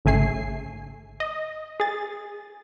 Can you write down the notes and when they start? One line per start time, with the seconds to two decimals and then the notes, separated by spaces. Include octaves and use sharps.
0.05 G#1 C#3 A3 G#5 C7
1.20 D#5
1.80 G#4 A6